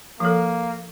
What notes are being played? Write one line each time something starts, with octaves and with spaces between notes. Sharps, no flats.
F3 A#3 A4